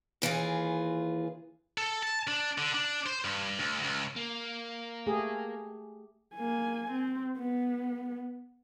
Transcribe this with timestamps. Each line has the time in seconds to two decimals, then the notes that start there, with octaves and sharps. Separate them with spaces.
0.22 D#2 E3 F4 G#4
1.78 A4
2.03 A5
2.28 D4
2.58 D3
2.74 D4
3.06 C5
3.25 G2
3.60 D2
3.84 C#2
4.16 A#3
5.07 A3 G4 G#4
6.35 A#3 G#5
6.91 C4
7.38 B3